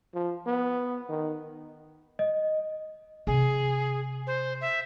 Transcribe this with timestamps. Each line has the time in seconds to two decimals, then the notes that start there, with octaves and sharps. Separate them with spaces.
0.14 F3
0.46 B3
1.09 D#3
2.19 D#5
3.27 C3 G#4
4.27 C5
4.61 E5